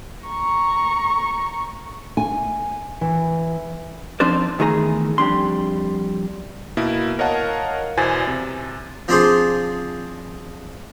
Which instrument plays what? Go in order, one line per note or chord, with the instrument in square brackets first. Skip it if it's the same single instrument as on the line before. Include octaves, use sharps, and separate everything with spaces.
[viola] A#5 C#6
[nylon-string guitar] G#5
E3
[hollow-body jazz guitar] F3 C4 D4 D#4 C5 D5
E2 D#3 A3 G#4 A#5
F2 G3 D4 C6
[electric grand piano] B2 A#3 E4
A#4 C#5 D#5 F5 F#5 A5
E2 B2 E3 C5 G#5 A6
C3
[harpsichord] F3 C4 D4 F4 G#4 C5